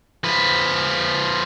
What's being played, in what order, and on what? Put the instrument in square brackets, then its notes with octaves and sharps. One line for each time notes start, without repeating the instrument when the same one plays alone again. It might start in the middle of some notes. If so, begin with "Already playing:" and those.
[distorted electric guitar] F3 B4